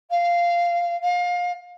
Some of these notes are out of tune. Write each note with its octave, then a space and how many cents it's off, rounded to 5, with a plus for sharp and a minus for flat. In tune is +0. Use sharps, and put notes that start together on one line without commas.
F5 -10
F5 +25